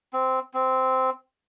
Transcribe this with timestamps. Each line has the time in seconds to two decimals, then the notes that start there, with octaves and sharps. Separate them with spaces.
0.13 C4
0.54 C4